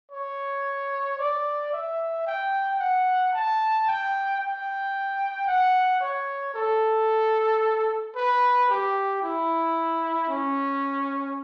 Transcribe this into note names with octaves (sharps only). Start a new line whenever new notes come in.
C#5
D5
E5
G5
F#5
A5
G5
G5
F#5
C#5
A4
B4
G4
E4
C#4